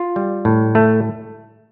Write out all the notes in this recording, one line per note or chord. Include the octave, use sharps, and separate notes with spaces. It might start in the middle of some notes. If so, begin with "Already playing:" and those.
Already playing: F4
G3
A2
A3